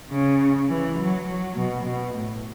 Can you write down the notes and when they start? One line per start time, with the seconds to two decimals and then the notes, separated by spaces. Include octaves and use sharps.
0.11 C#3
0.69 E3
0.98 F#3
1.27 F#3
1.56 B2
1.85 B2
2.14 A2